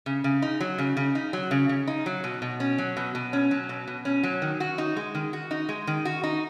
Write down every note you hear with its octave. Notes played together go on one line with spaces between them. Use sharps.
C#3
C#3
D#4
F#3
C#3
C#3
D#4
F#3
C#3
C#3
D#4
F#3
B2
B2
C#4
F#3
B2
B2
C#4
F#3
B2
B2
C#4
F#3
D#3
F#4
D#4
G#3
D#3
F#4
D#4
G#3
D#3
F#4
D#4